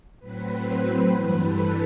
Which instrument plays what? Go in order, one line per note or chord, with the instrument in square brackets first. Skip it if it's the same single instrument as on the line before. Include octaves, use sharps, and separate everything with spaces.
[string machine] A2 F#3 C4 B4
C5
G2 E3 G3 B4
A4